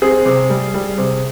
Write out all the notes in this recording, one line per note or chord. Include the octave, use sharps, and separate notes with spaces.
C4 G#4
C3
G3
G3
C3